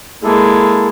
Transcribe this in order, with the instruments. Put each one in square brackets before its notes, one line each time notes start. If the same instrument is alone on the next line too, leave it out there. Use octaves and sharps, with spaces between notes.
[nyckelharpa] G#3 [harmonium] A#3 E4 A4